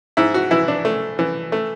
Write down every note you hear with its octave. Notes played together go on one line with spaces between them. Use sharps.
G#2 E4
F#4
E3 E4
D4
A3
E3
A3